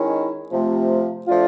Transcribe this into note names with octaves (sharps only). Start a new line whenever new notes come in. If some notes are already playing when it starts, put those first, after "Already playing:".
Already playing: D#3 G#3 C#4 E4
C3 F3 A3
F3 A3 D4 F4